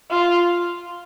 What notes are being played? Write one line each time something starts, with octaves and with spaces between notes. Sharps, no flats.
F4